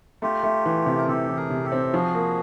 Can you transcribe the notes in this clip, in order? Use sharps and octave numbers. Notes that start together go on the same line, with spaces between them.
A3 F4 G4
A3
E3
C3
A#4
C3 G4 A4
E3
G#4 A#4
C3
G4 A4
C4
F3 F#4 G#4
A#3